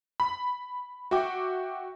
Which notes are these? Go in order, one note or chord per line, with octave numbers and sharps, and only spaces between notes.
B5
F#4 E5 G5 D6